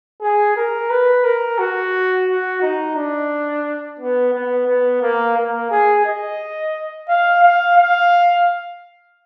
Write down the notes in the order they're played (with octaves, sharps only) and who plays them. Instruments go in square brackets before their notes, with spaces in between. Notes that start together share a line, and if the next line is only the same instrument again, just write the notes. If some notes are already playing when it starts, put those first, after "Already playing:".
[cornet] G#4
A#4
B4
A#4
F#4
F#4
D#4
D4
B3
B3
B3
A#3
A#3
G#4
D#5
F5
F5
F5